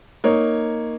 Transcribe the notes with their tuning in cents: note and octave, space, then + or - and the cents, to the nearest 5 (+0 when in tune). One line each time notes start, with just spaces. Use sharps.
A#3 +0 D#4 +0 C#5 +0